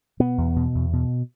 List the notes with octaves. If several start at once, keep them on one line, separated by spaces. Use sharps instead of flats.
B2 B3
E2
B2
E2
B2